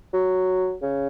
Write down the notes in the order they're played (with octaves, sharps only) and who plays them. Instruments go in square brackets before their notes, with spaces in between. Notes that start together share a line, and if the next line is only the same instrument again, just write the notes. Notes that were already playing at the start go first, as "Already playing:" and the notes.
[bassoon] F#3
C#3